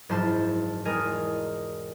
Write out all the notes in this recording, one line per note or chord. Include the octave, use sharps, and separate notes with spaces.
F#1 G#2 F3 E4 C5 A5
E1 G#3 D4 A#4 D#5 G#5